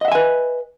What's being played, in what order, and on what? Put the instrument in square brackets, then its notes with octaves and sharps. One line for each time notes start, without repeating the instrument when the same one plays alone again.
[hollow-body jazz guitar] D#5
F#5
E5
G#5
B4